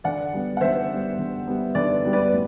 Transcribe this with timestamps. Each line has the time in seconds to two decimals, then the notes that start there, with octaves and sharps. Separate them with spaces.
0.04 D3 D5 F#5
0.33 G3 B3
0.57 F#5
0.61 D3 C5 E5
0.90 G3 B3
1.19 D3
1.47 G3 B3
1.75 D3 B4 D5
2.04 G3 B3
2.13 B4 D5
2.32 A2